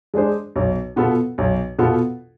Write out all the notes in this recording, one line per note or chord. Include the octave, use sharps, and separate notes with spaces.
G#3 D4 G#4 C5
B1
B2 B3 F4 A4
B1
B2 B3 F4 A4